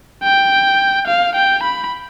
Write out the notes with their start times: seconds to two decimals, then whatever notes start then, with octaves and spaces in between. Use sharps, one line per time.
0.23 G5
1.07 F5
1.35 G5
1.63 B5